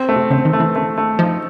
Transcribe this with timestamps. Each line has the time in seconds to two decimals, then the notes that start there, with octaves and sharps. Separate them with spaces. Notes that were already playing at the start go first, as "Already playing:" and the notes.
Already playing: C4
0.09 A3
0.16 C3
0.31 C#3 C4
0.45 D#3
0.53 A3
0.60 E3
0.75 A3
0.98 A3
1.19 F3 D#4